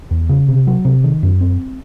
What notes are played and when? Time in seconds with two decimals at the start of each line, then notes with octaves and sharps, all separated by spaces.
0.11 E2
0.29 C#3
0.48 C3
0.67 F#3
0.85 C3
1.04 D#3
1.23 F#2
1.41 C4